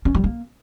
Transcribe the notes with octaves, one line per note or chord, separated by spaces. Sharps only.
C#4
G3
A#3